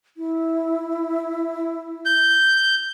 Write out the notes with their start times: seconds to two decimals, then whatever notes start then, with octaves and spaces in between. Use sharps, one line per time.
0.17 E4
2.06 G6